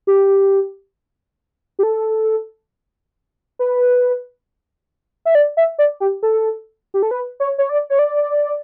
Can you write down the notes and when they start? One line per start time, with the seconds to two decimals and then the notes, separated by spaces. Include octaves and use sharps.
0.07 G4
1.79 G4
1.83 A4
3.59 B4
5.25 E5
5.35 D5
5.57 E5
5.79 D5
6.00 G4
6.23 A4
6.94 G4
7.03 A4
7.11 B4
7.40 C#5
7.58 C#5
7.69 D5
7.90 C#5
7.99 D5